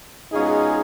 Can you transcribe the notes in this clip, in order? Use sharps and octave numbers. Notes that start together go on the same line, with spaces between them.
B2 G#3 C#4 D#4 F4 G#4